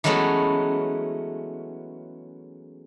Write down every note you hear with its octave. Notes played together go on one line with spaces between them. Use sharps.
E3 F#3 G#3 A3 B3 C#4